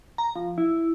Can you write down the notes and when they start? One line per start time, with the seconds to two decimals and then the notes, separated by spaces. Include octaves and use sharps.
0.18 A#5
0.36 F3
0.58 E4